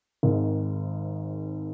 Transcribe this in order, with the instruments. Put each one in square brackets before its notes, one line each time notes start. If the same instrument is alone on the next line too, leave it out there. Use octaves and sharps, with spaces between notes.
[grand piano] G#1 G#2 D#3